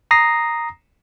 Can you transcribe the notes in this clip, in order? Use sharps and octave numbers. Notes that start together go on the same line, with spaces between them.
A#5 D#6 A#6 C7